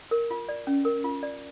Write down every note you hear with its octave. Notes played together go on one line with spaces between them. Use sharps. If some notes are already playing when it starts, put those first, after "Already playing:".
A#4
F4
D5
C#4
A#4
F4
D5